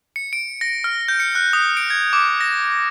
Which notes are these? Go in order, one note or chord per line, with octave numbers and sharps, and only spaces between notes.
C#7
D7
A#6
F6
G6
C#7
F#6
D#6
D7
G#6
D6
A#6